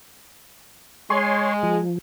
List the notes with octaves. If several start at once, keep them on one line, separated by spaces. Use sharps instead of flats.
G#3 C#5 G#5 C6
F3